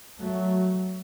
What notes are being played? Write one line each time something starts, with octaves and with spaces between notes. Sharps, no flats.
F#3 A3